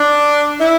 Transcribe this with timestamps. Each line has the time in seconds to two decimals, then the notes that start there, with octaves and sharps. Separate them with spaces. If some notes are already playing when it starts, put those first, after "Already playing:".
Already playing: D4
0.58 E4